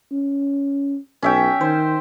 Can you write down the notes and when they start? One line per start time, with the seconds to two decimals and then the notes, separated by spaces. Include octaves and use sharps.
0.12 C#4
1.22 B1 C#4 E5 G5
1.61 D#3 C5